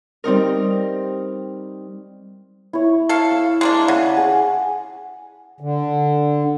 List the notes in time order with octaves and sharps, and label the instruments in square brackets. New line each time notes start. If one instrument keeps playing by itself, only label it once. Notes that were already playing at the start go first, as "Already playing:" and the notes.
[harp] G3 C4 D#4 A#4
[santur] E4 C#5
[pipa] A4 F5
[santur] E6
[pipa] G#3 A#3 D4
[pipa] C#3 [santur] F#5 A5 D#6
[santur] G#4
[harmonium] D3